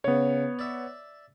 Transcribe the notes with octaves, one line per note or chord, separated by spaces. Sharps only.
C#3 B3 C#5
D5 E5